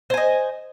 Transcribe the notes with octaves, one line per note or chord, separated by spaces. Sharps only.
C5 D#5 G#5